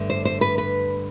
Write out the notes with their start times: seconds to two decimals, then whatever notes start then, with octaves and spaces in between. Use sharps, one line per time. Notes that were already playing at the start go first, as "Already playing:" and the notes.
Already playing: G2 D3 A3
0.10 C5
0.25 C5
0.41 B4
0.58 B4